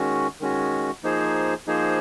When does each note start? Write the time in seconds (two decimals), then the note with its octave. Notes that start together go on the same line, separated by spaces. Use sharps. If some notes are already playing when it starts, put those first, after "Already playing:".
Already playing: D#3 G#3 C#4 F#4
0.40 D#3 G#3 C#4 F#4
1.04 F3 A#3 D#4 G#4 C5
1.67 F3 A#3 D#4 G#4 C5